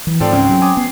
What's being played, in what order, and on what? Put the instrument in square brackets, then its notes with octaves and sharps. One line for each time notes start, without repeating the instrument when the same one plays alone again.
[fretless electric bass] E3
[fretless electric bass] G#2 [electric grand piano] F3 A4 D5 [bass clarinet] C4
[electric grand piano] C#2 [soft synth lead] C#4
[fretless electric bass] F#3
[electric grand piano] G#5 D6 D#6
[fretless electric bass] B3 [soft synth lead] C7